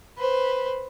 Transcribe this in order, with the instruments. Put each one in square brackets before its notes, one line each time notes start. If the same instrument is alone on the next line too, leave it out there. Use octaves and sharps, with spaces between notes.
[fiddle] B4 C5